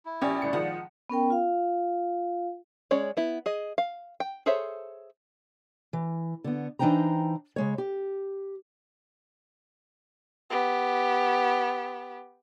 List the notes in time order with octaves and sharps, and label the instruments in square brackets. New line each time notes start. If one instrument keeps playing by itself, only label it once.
[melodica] E4
[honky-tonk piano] A#1 G4 [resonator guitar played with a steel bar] C#4 [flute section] D5
[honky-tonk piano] G1 A2 C#7
[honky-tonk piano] D#3 F3 G#3 [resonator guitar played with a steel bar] F#5
[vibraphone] B3 C#4 A#4 G5
F4 F5
[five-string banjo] G#3 C#4 C#5 D5
B3 E4
G#4 D#5
F5
G5
G#4 A4 C5 C#5 E5
[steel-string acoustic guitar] E3
D3 B3
E3 D4 D#4 C5 G5 A#5
C#3 G#3 C#5
G4
[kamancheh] B3 G4